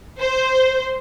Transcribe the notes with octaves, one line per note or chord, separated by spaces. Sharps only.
C5